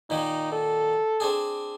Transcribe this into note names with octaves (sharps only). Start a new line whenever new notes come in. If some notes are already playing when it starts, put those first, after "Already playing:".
A#2 D#3 A#3 D#4
A4
C4 D4 G#4